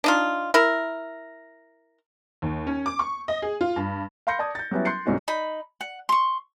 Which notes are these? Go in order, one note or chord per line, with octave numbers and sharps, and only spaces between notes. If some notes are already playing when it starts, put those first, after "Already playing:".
D4 D#4 F4
E4 A#4
D#2
C#4
D6
C#6
D#5
G#4
F4
G2
F5 B5 C6 G6 A#6 C#7
D5 A5 D#6 G#6
G6 A6
F#3 G3 B3 C#4 E4
C6 F#6 G6 C7 C#7
C2 G#2 D3 C#4 D#4 F#4
D#4 B5
F#5
C6 C#6